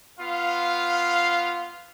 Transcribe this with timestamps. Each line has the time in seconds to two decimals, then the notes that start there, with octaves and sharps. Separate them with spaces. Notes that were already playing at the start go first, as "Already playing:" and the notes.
0.19 B3 F4 F5